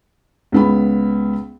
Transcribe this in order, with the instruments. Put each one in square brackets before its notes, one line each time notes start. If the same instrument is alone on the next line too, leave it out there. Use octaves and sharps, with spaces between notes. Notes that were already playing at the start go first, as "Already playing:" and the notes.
[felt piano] C#2 B3 B5